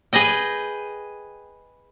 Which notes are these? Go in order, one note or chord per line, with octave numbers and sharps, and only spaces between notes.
G#4 B4 D#5 G5